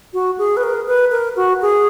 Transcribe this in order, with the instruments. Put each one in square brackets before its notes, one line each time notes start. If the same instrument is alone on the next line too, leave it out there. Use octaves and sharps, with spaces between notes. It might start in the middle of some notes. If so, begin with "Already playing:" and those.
[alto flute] F#4
G#4
B4
A#4
B4
A#4
F#4
G#4